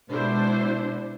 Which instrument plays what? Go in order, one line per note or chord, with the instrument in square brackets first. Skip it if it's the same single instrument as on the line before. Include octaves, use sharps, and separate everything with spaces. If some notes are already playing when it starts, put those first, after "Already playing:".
[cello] B2 G#3 [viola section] D4 E4 C5